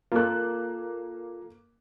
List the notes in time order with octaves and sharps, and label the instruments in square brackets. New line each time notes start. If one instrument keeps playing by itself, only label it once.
[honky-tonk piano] A#3 F#6 [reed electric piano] F4 A4